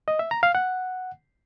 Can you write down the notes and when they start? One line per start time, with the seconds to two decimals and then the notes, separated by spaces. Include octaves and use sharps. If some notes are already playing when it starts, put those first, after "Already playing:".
0.08 D#5
0.19 E5
0.31 A#5
0.43 F5
0.55 F#5